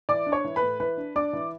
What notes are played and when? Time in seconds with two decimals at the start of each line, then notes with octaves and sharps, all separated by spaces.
0.09 E3 D5 D6
0.27 D4
0.32 C#5 C#6
0.45 E3
0.56 B4 B5
0.62 A2
0.80 E3 B4 B5
0.97 D4
1.16 D4 D5 D6
1.33 E3